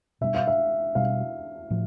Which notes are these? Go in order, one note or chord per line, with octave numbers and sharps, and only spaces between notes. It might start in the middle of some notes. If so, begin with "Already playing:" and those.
B2 G3 D4 E5
F5
E5
B2 G3 D4 F5
A2 F3